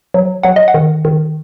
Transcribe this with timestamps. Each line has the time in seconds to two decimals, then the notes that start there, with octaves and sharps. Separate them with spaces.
0.14 F#3
0.43 F#3 F#5
0.56 D#5
0.68 F#5
0.74 D#3
1.05 D#3